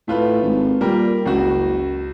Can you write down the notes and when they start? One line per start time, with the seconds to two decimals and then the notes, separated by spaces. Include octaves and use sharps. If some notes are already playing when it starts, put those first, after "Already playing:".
0.08 A2 A3 F4 B4
0.42 G#1
0.81 A#2 G3 A#4
1.26 F#1 C#2 F#4